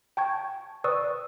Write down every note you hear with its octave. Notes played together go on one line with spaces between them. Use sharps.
G5 A5 C#6 G#6
B4 D5 C#6 D#6 E6